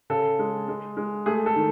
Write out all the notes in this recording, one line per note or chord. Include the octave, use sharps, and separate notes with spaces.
C#3 A4
G#3
G#3
G#3
A3 G#4
A4
D#3